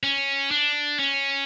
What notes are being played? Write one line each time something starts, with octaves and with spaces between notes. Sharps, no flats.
C#4
D4
C#4